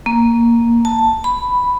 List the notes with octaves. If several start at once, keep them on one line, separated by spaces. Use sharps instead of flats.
A#3
A5
B5